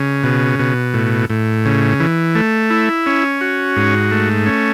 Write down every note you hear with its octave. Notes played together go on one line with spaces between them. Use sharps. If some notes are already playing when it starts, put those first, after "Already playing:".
Already playing: C#3
B2
B2
A2
A2
C#3
E3
A3
E4
C#4
F#4
G#2
A3
C#4